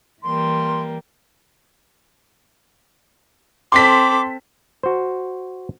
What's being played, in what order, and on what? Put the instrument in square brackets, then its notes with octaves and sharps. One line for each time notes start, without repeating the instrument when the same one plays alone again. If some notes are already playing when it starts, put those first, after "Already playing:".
[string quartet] E3 G3 A#3 [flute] C6
[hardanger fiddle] C4 A4 [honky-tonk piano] C6 B6 [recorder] D6
[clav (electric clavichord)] F#4 C5